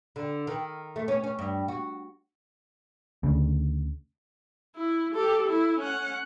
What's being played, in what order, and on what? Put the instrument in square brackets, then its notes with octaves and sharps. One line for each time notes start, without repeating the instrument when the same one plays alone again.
[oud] D3
D#3
A3
C#4
C#4
G2
F#4
[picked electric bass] D2 C#3
[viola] E4
G4 A4
E4
C#4 F#5